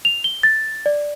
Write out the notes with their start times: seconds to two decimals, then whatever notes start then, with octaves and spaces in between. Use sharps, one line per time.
0.05 F7
0.24 G7
0.43 A6
0.86 D5